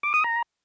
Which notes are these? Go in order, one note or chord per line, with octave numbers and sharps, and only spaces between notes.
D6
D#6
A#5